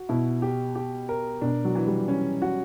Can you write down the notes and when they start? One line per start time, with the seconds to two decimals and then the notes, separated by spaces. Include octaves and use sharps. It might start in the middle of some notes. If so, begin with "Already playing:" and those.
Already playing: F#4
0.09 B2 E4
0.42 G4
0.75 G4
1.09 A#4
1.41 B2 D4
1.65 F#3
1.75 E3
1.87 G3
2.08 C#4
2.42 F#4